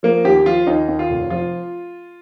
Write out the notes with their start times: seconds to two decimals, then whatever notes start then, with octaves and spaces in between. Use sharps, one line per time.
0.03 F3 A#3
0.24 D#2 G4
0.36 G4
0.45 F3 F4
0.67 D#2 D#4
0.88 D#2
0.99 F4
1.09 F1
1.30 F3 F4